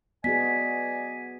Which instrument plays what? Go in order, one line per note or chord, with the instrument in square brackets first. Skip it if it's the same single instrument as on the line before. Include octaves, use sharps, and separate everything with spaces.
[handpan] B3 F#4 G#4 [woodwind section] D5 D#5 G#5 [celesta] B6